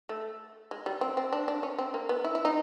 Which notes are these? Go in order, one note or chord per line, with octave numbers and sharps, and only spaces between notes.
A3
G#3
G3
C4
C4
D4
D4
C#4
C4
A#3
B3
E4
E4
D#4